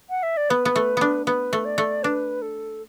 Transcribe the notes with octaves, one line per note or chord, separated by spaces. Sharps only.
F#5
E5
D5
B3 B4
B3
A3
B3 D4
B3 B4
A3
D5
A3
D4 B4
A4